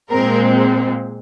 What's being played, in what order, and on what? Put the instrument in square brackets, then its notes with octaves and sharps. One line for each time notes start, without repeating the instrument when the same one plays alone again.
[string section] A#2 G#3 C4 A#4